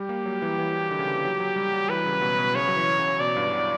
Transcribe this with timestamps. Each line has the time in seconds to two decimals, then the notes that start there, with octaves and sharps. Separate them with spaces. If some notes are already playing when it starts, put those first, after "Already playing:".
Already playing: G3 G4
0.09 A#3
0.25 F#3
0.42 E3
0.58 E3
0.91 D3
0.99 C#3
1.07 D3
1.24 F#3
1.40 F#3
1.56 G3
1.73 G3
1.89 E3 B4
2.06 C#3
2.22 B2
2.38 B2
2.55 C#3 C#5
2.68 F#3
2.77 E3
2.99 C#3
3.20 B2 D5
3.36 G2
3.53 B2